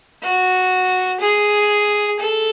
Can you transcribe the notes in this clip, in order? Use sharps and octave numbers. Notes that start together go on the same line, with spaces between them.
F#4
G#4
A4